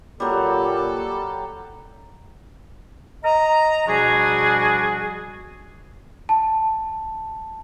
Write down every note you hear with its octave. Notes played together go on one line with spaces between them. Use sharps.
A#2 F#3 G3 G4 A4
D#5 A#5
B2 F3 G3 D4 F#4 G#4
A5